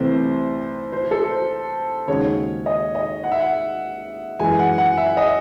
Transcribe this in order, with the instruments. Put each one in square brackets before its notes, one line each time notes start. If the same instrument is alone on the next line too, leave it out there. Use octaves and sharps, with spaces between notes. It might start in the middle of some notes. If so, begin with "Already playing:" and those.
Already playing: [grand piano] C2 C3 E3 A3 C4 [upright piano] C5
[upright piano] C5
A4
C5
[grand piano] D#2 C#3 G#3 C#4 F#4 [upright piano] C#5
[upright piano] D#5
D#5
F#5
E5
F#5
[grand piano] F#2 E3 G#3 [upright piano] G#5
[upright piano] F#5
F#5
E5
D#5